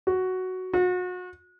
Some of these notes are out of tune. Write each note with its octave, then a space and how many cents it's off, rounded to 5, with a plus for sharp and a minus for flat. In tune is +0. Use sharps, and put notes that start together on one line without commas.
F#4 +5
F#4 -35